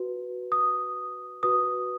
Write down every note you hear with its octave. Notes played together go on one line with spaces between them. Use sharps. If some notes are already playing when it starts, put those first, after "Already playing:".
Already playing: F#4 B4
D#6
F#4 B4 D#6